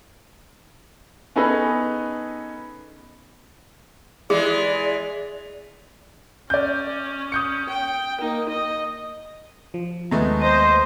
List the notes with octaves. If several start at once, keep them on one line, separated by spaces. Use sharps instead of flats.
B3 C#4 D#4 G#4 A4 B4
E3 G#3 G#4 D5
C#4 D5 G6
D#6 G6 C#7
G5
A#3 D#4
D#5
F3
D#2 G#3 A3 B3 A#5
C5 D#5